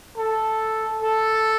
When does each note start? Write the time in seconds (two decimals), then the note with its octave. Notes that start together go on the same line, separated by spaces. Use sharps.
0.18 A4
1.02 A4